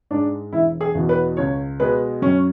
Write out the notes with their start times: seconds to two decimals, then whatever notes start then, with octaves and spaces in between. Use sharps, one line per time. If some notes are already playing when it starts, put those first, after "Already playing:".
0.11 G#2 G#3 D4
0.53 E1 E4
0.81 G#4
0.95 E2 B2
1.09 B4
1.37 C#2 C#5
1.80 B2 G#3 B4
2.22 F#2 C#4